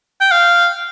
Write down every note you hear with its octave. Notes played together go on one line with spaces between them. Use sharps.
G5
F5